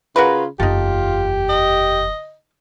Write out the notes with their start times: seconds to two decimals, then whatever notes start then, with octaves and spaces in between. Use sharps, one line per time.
0.16 C#3 F4 F#4 A#4 B4
0.60 F#1 E2 D#4 F4 G4 A4
1.49 D#5